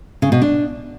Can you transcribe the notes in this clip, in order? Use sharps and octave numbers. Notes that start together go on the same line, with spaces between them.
C#3
B2
D4